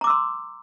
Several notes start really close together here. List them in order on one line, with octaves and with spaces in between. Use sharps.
A#5 D6 E6 C6